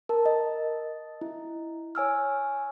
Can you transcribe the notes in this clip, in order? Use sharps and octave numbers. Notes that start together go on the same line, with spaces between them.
A#4 A5
D#5
E4
C#5 G#5 E6 F6